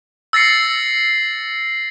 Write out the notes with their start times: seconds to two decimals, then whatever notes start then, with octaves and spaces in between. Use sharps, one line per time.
0.33 E6 A6 A#6 C7 C#7